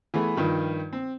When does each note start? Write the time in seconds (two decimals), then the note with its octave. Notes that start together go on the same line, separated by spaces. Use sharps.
0.14 E3 A3 B3 G#4
0.37 G2 D#3 F3
0.93 C4